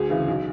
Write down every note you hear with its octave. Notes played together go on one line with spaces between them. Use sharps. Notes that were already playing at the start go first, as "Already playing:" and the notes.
Already playing: D2 G#4
C#3 E3
B1